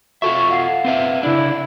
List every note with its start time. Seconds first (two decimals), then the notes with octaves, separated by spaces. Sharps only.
0.22 F4 F#4 A4 E5 C#6
0.51 F5 F#5 C7
0.85 C4 B4 E5
1.23 C#3 D4 E4 D5